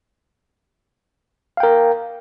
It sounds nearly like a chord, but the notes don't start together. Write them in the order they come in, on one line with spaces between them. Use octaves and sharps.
F5 G5 A#4